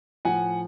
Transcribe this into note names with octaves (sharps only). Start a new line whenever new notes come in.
A2 F3 F#5 G#5